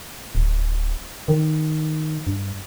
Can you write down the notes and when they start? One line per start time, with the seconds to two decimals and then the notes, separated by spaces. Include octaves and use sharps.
0.35 D1
1.28 D#3
2.27 G2